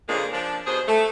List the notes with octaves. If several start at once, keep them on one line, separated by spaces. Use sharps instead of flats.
F2 A#2 C#3 G#3 A#3 D4
F3 D4
D#2 B2 F3 G#4 C5
A3